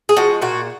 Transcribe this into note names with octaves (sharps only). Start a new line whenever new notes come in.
G#4
F3 G#3 F#4
A#2 F#4